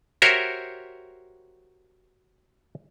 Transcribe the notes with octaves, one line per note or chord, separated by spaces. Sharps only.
F#4 G4 A#4 C5 C#5 E5